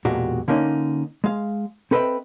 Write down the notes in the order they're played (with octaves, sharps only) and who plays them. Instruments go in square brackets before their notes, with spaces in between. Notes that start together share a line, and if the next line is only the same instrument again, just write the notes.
[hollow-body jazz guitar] B1 E2 A#2 G#3 F#4 G4
D3 A#3 C#4 D#4
G#3 F5
C4 A4 B4 D#5 E5 G5